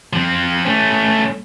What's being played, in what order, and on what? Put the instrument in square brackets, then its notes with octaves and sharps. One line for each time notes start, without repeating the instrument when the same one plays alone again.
[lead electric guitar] F3 C4
A3 C#4